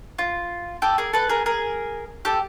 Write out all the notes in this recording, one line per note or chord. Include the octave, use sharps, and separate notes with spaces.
F4
G4 A4
G#4 A#4
A4 B4
G#4 A#4
G#4 A#4
G4 A4